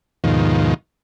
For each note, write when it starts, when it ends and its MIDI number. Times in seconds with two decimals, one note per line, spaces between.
0.24 0.74 39
0.24 0.74 44
0.24 0.74 47
0.24 0.74 51
0.24 0.74 53